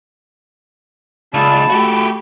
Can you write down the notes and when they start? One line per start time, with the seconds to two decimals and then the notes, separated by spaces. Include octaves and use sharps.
1.34 C#2 D5 A5 B5
1.70 A3 F#4 G4